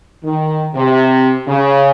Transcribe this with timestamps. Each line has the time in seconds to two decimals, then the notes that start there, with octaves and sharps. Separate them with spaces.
0.23 D#3
0.75 C3
1.47 C#3